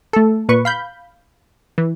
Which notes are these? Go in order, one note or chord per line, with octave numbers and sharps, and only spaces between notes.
A3 A4
A#2 B4 C#6
F5 B5 G6
E3